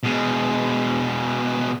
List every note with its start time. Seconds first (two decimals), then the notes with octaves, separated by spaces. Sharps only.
0.03 B2 G#3